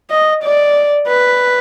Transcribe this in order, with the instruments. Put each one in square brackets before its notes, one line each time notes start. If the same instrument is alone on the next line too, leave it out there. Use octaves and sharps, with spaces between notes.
[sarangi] D#5
D5
B4